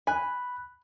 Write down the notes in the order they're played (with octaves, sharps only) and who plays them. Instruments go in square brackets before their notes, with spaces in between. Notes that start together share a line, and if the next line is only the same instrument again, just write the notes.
[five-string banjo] G#5 [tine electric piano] B5 F#6